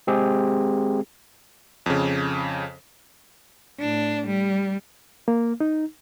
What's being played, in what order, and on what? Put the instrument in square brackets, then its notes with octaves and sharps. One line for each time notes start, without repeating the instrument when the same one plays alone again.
[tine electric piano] G#3 C4 G4 G#4
[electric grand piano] F2 C#3
[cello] A2 D4
G3
[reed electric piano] A#3
D#4